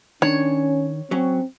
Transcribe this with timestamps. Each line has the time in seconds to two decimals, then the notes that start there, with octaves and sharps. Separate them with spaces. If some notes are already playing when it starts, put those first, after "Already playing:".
0.22 D#3 C#4 D4 C#5
1.11 F#3 C4 C#4